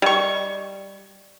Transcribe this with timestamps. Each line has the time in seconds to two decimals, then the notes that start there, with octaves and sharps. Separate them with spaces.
0.02 G3 D5 D#5 C#6